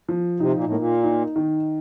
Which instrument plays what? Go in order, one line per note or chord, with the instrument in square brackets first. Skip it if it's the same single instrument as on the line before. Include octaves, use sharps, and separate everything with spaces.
[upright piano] F3
[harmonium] C3 [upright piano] D#4
[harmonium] A#2
A2
[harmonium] A#2 [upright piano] A#3
[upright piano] D#4
D#3